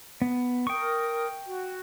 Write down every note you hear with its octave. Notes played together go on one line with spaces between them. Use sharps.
B3
A#4 G5 C#6 D#6
F#4